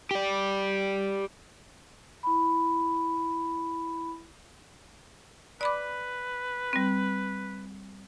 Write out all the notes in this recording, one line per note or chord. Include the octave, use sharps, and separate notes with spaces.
G4 D5
E4 B5
B4 D5 B5 D6
G3 C4